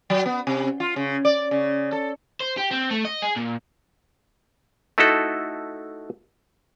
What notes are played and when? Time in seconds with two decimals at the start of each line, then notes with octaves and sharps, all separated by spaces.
0.10 F#3
0.26 B3
0.47 C3
0.80 F4
0.96 C#3
1.25 D5
1.51 C#3
1.92 A4
2.41 C5
2.58 G4
2.71 C4
2.91 A3
3.05 D#5
3.22 G#4
3.36 A#2
4.98 A3 D#4 E4 F#4 A4